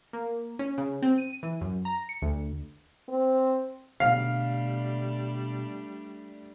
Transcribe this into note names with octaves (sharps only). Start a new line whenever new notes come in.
A#3
C#4
C#3
C4
D#7
E3
F#2
A#5
C#7
D2
C4
B2 D3 G3 A3 D4 F5